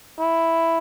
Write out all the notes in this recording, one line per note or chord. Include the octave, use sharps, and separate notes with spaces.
E4